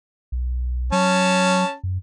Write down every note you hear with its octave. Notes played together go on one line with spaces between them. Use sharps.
B1
F#3 C#4 A5
F#2